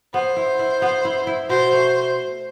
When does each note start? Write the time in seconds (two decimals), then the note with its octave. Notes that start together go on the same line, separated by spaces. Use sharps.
0.14 B3 C5
0.37 E4
0.59 E4
0.82 B3
1.05 E4
1.27 E4
1.49 B2 C5
1.72 A3